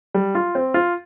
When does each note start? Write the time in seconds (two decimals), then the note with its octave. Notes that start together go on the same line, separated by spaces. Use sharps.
0.14 G3
0.35 F4
0.55 C4
0.74 F4